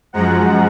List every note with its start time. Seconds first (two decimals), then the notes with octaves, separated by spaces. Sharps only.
0.13 F#2 F3 G#3 F#5 A#5